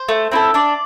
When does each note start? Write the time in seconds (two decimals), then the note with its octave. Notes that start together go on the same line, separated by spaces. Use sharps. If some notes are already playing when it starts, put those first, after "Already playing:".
Already playing: C5
0.09 A3
0.32 C4 E4 A4
0.54 D4 D5